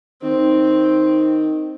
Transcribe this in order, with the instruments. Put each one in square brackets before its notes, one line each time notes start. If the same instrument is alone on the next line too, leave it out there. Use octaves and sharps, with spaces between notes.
[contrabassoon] D#3 [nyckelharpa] C4